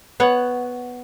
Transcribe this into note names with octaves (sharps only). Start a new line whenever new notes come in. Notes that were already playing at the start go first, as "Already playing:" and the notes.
B3 C#5 F#5